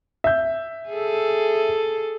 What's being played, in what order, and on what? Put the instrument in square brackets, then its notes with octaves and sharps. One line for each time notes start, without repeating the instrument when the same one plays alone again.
[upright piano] E5 G6
[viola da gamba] G#4 A4